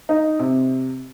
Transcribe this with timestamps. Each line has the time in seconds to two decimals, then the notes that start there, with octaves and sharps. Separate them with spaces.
0.09 D#4
0.39 C3